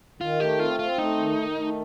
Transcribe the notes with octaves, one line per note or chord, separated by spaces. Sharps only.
D#3 F4
A3 G4
C4 F4
C4 F4
A3 D#4
D#3
D#3
A3